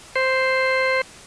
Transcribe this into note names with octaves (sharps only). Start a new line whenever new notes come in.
C5